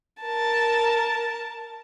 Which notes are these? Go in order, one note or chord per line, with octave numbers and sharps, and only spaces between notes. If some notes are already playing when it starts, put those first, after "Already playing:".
A#4 A5